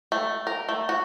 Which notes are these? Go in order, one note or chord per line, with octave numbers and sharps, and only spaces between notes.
A3
A#4
A3
F#4